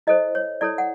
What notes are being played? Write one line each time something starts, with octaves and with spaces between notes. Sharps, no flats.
E4 A4 C5 D#5
C#5
E4 A4 C#5 D5
F#5